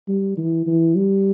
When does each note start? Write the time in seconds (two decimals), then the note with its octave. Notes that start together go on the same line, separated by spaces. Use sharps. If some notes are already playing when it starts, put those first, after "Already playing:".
0.08 G3
0.37 E3
0.66 E3
0.96 G3